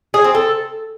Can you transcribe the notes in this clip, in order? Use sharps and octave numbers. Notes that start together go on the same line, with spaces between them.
G#4
C4
A4